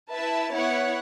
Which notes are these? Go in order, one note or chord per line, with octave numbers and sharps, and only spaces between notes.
E4 B4 E5 A5
B3 E4 C#5 F#5